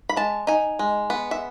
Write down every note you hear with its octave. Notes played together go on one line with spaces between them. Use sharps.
B5
G#3 A5
D#4 G#5
G#3
B3
E5